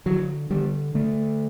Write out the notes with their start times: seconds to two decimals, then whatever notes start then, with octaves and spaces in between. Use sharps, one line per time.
0.06 D3 F#3
0.50 D3 G3
0.94 D3 A3